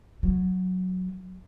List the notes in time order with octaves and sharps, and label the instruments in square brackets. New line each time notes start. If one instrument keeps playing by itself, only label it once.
[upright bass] F#3